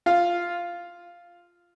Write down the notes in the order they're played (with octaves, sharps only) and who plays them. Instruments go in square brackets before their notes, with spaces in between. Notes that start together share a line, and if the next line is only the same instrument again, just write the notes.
[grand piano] F4 F5